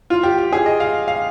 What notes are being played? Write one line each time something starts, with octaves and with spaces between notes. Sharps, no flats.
F4
G4
G4
G#4
D#5
F5
F5